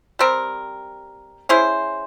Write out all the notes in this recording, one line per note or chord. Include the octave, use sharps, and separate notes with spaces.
G3 C4 G4 A#4
C#4 E4 G#4 C5